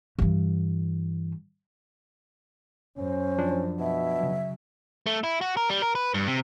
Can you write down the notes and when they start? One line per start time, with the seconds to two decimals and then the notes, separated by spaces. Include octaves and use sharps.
0.19 G2 E3
2.98 F#2 C#4 C5
3.38 F3 D4
3.80 B2 E5
4.14 C#3 F#3
5.06 A3
5.24 E4
5.41 F#4
5.57 A#4
5.69 G3
5.82 A#4
5.95 B4
6.14 G2
6.28 C3